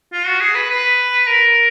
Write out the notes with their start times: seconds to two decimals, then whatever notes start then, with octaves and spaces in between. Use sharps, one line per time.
0.12 F4
0.27 F#4
0.41 G#4
0.55 B4
0.70 B4
1.27 A#4